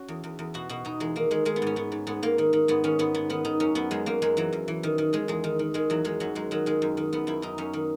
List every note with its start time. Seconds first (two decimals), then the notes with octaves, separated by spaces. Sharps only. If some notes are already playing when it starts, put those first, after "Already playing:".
Already playing: C#4 F#4
0.08 E2
0.24 E2
0.39 E2
0.54 B2 F#4
0.69 B2 F#4
0.85 B2 D#4
1.00 E2 G#3
1.16 D#3 A#3
1.31 D#3 G#3
1.45 D#3 G#3
1.56 B3
1.62 G#2 C#4
1.76 G#2 B3
1.92 G#2
2.07 G#2 B3
2.23 G#2 A#3
2.38 D#3
2.53 D#3
2.68 G#2 B3
2.84 D#3 C#4
2.99 G#2 B3
3.15 G#2 B3
3.30 D#3 B3
3.45 D#3 D#4
3.60 F#2 C#4
3.75 F#2 B3
3.91 F#2 G#3
4.06 F#2 A#3
4.22 F#2 G#3
4.37 E3 F#3
4.53 F#2
4.68 E3
4.83 D#3
4.98 D#3
5.13 D#3 G#3
5.28 E2 G#3
5.44 D#3
5.59 D#3
5.74 D#3 G#3
5.90 E2 F#3
6.04 D#3 G#3
6.20 F#2 F#3
6.35 F#2 G#3
6.51 D#3 F#3
6.66 D#3 G#3
6.82 F#2
6.97 D#3
7.13 F#2 B3
7.27 F#2 E4
7.42 F#2 D#4
7.58 F#2 C#4
7.73 D#3